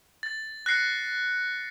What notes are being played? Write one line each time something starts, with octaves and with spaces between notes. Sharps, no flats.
A6
F#6 A#6 C7 C#7